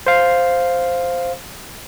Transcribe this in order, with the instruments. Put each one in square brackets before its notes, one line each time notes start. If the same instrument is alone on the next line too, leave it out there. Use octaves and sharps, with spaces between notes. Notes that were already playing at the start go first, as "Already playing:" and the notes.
[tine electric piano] C5 F5